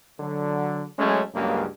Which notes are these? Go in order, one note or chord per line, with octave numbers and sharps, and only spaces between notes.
D3 F#3
F#3 G#3 A3 C#4
C#2 G2 C#3 F#3 A#3